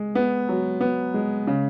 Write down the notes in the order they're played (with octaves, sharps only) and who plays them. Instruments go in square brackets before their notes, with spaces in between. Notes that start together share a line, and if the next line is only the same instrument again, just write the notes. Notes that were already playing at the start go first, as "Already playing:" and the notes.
Already playing: [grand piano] G#3
B3
F#3
B3
G#3
C#3